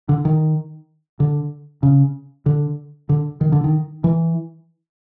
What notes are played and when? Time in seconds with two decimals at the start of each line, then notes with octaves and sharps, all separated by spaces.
0.09 D3
0.25 D#3
1.20 D3
1.83 C#3
2.46 D3
3.09 D3
3.41 D#3
3.52 D3
3.64 D#3
4.04 E3